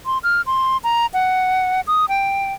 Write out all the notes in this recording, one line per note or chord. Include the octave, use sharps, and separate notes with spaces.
C6
F6
C6
A#5
F#5
D#6
G5